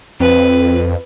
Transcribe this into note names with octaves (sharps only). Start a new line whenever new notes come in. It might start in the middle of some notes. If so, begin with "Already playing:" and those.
F2 C4 B4